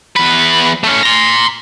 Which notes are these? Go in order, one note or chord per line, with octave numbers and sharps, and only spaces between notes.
E2 B4
A3 C#4
A#5 C6